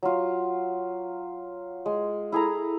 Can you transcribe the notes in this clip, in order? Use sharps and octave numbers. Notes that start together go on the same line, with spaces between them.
F#3 F4
G#3
E4 G#4 A4 A#5